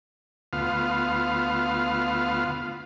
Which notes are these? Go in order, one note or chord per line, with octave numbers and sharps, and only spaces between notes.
D2 B3 F4 F5